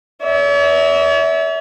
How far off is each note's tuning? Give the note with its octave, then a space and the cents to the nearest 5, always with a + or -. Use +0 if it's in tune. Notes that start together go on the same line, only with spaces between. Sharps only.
C#5 +45 E5 -25